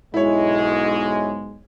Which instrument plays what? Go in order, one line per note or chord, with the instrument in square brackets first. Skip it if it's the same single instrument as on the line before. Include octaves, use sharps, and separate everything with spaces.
[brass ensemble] B1 G#2 G#3 [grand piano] E4 C#5